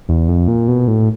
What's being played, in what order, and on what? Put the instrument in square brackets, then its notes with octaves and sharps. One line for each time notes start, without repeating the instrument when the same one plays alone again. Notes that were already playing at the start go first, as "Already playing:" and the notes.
[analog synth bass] E2
F2
A#2
B2
A2